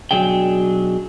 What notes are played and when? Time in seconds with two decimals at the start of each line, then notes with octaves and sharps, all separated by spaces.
0.11 B1 B2 F#3 D4 G#4 G5